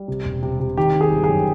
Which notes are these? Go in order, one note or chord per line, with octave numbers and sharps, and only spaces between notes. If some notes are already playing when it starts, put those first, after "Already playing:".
Already playing: G3
C3
E1
C3
C3
D#3 G4
D#3
G#4
G1
G#4
F#2